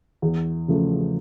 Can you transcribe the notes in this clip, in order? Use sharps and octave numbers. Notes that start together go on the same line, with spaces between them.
E2
C#3 F3 A3